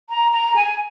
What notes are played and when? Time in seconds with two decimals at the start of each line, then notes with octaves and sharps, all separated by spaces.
0.10 A#5
0.32 A#5
0.56 G#5